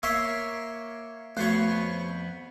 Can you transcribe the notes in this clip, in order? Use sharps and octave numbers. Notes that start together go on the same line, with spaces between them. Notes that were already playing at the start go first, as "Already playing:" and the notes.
A#3 C#5 E5 C6
F2 A3 B3 F#4 C5 C#5